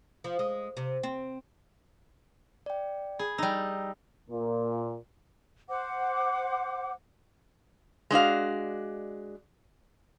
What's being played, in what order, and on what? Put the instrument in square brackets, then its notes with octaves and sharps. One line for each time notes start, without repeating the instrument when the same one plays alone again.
[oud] F3
G#3
C3
C4
[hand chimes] D5 G5
[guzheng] G#4 [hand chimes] B5
[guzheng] G3 D#4 [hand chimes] E6 A#6
[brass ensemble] A#2
[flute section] C5 F#5 D6
[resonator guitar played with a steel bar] G#3 D4 F#4 F5